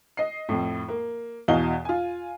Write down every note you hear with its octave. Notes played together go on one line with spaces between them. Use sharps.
D#5 C7
F2 A2
A#3
E2 B2 E3 D#5 F5 G7
F4 G#5